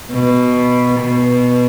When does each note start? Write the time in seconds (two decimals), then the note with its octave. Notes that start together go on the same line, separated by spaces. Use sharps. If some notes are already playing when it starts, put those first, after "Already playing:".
0.10 B2
1.00 B2